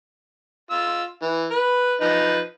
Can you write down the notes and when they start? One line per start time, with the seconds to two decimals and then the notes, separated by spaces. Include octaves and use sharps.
0.71 F4 E6
1.22 E3
1.51 B4
2.01 F3 D#4 B4